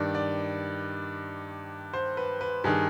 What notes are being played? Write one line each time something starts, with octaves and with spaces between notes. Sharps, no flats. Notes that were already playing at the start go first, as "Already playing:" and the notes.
Already playing: G2 D#3 D5
D5
C5
B4
B4
G2 D#3 G#4